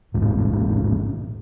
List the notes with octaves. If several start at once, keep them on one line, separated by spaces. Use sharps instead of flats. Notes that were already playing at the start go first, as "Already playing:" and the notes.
D#1 A1 G#2